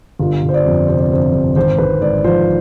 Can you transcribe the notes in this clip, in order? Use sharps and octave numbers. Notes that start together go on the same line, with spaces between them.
G1 F4
G1
C5
D5
F2
C3 C5
D5
G1 C5
G1
G#1 C5
G#1 B4
G#2 D5
F3 C5